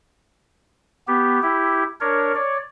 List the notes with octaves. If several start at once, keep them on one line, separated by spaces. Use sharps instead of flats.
B3 G4
E4 G4
D4 A#4 C#5
C#5 D5